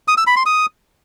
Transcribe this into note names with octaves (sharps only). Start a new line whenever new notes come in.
D#6
E6
B5
C6
D#6